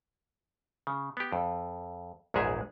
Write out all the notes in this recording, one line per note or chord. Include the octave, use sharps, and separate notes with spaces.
C#3
B3 G4
F2
A#1 E2 G#2 G#3 G#4 E5